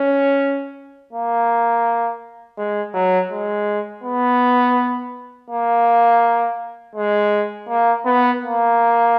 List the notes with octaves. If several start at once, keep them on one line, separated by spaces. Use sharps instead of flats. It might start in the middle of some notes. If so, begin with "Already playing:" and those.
Already playing: C#4
A#3
G#3
F#3
G#3
B3
A#3
G#3
A#3
B3
A#3